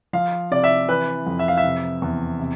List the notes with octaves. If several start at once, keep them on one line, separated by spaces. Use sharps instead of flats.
F3 F5
C3 D5
E5
E3 B4
F2
E5
F5
E5
C3
E2
C3